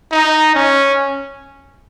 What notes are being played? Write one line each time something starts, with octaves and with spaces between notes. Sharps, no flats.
D#4
C#4